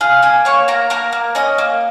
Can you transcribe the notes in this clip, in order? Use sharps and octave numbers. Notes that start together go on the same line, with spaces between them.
F4 G#4 F5
A#3 G#4 G#5
A#3 C#5 C#6
A#3 A#4 A#5
A#3 A#4 A#5
A#3
C#4 D#5 D#6
A#3